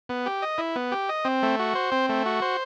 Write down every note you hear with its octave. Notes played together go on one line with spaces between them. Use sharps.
B3
G4
D#5
E4
B3
G4
D#5
C4
A3
F#4
C5
C4
A3
F#4
C5